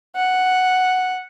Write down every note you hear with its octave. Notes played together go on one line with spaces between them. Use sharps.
F#5